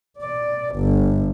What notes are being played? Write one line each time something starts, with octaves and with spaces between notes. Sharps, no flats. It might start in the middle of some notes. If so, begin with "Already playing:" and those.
D5
G1